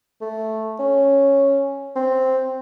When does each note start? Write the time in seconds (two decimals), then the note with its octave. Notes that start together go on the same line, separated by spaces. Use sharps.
0.21 A3
0.79 C#4
1.96 C4